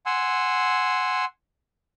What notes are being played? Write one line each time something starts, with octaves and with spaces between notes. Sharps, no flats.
F#5 G#5 C6 E6